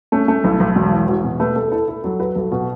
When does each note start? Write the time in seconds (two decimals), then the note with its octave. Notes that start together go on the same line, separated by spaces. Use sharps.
0.12 A3 C#4
0.28 A3 C#4
0.44 B1 E4
0.60 B1
0.76 E1
0.92 E3
1.08 E2 F#4
1.24 B2
1.40 A3 B4
1.56 A3 A4
1.68 B4
1.72 E4 A4
1.88 E4 A4
2.04 F#3 A4
2.20 F#4 B4
2.36 B1 A4
2.52 B2 F#4